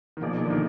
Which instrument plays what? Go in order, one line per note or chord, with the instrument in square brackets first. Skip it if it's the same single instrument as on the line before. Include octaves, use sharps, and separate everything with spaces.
[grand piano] D#3
[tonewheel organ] B2 A#3 D#4 G#4 D5 [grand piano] F3
[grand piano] D3
D#3